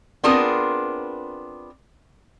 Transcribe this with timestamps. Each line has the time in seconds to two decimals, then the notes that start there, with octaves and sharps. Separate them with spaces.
0.24 B3 C4 D4 F4 G#4 A#4